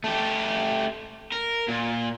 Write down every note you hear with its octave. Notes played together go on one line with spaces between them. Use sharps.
A3 G4
A#4
A#2